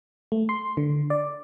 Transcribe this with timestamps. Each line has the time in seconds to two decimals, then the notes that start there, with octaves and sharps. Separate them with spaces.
0.32 A3
0.49 C6
0.77 D3
1.10 D5